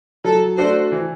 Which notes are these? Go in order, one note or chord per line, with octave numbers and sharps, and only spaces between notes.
F#3 A4
A3 D4 F#4 A4 C5
E3